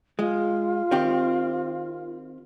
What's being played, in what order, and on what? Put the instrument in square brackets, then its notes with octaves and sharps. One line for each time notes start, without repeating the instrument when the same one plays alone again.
[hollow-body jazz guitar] G#3 [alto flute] F4
[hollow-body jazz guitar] D#3 C4 G4